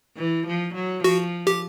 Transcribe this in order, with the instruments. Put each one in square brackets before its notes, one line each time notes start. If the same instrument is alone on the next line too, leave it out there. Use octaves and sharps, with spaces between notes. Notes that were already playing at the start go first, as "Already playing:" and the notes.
[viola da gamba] E3
F3
F#3
[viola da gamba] F3 [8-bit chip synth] F#4
[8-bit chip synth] G4